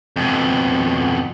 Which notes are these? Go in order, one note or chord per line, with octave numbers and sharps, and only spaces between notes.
F2 B2